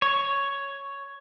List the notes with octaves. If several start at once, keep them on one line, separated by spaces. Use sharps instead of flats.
C#5